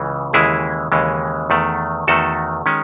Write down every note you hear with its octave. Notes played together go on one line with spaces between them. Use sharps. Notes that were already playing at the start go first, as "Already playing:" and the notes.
Already playing: C#2 C#3 E3
D#2 C#3 E3 G#3 E4 G#4
D#2 C#3 E3 G#3
E2 D#3 A3
E2 D#3 A3 F#4 A4
D#3 G#3 C#4